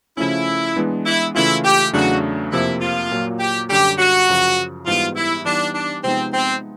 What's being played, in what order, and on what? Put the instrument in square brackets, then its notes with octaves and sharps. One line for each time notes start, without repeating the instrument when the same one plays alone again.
[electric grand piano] C#3 F3 A3 C#4 [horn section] E4
[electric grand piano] E3 G#3 B3 D4
[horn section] E4
[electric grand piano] C#3 E3 A3 C#4 F4 [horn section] E4
[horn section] G4
[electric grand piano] E2 C#3 F#3 A3 D4 [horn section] F#4
[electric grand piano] F2 C3 F3 A#3 [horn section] E4
[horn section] F4
[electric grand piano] A#2 F#3 A#3
[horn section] G4
[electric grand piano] F#2 D3 G3 [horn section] G4
[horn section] F#4
[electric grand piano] F#2 C#3 F3
[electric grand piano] G#2 E3 G3 B3 [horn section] F4
[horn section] E4
[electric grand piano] E3 G3 B3 D#4 [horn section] D4
[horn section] D4
[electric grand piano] C3 F3 G#3 B3 D#4 [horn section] C4
[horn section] C4